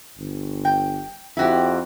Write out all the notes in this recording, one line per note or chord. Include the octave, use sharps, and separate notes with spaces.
G1
G5
F2 E4 F#4 G4